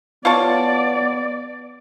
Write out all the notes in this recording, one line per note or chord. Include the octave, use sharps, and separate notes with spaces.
B3 F4 C#5 D5 A5